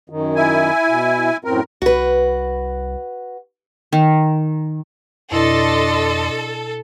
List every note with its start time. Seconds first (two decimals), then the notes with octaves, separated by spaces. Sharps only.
0.10 F#2 D#3
0.36 E4 G#5
0.88 B2
1.44 F#2 A2 C4 A#4
1.82 C2 F#4 B4
3.93 D#3
5.31 F2 B2 D4 E4 A4 D#5 C6